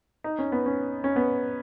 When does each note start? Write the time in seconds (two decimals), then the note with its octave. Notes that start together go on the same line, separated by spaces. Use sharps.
0.24 D#4
0.39 C#4
0.52 B3
0.66 C#4
1.04 C#4
1.16 B3